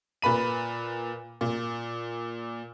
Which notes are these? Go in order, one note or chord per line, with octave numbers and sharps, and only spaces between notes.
A#2 B4 B5 D#7
A#2